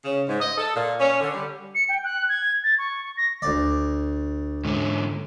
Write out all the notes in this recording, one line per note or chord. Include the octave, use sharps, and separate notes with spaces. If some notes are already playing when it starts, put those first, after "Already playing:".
C#3
G#2
D#5
A4
A#2
C#4
D3
G3
C#7
G5
F#6
G#6
A6
C#6
C#6
A#6
D2 D5
G#2 D3